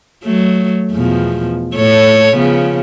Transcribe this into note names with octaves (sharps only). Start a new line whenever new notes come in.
F#3 A3
E2 B2 F3
A2 A4 C#5
C#3 F3 B3